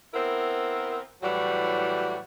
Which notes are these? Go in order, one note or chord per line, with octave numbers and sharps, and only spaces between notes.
B3 C4 E4 A#4
A2 E3 F#3 G3 F#4